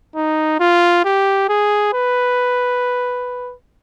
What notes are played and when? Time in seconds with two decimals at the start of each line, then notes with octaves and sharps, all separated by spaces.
0.15 D#4
0.60 F4
1.04 G4
1.49 G#4
1.93 B4